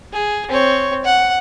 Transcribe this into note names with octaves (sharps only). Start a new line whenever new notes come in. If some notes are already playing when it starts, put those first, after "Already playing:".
G#4
C4 C#5
F#5